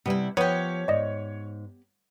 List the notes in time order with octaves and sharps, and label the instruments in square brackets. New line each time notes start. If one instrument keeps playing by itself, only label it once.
[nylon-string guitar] C3 G3 [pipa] B3 E4
[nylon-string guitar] F3 [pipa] B3 G4 [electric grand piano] C#5
[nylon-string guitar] G#2 [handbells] D5 D#5